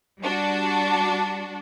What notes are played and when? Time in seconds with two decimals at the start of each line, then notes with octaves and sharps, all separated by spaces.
0.21 G3 D4 F#4